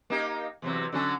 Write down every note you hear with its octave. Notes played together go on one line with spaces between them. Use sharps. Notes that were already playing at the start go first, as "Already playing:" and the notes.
A#3 D#4 G4
E2 C3 F#3
D3 F#3 C#4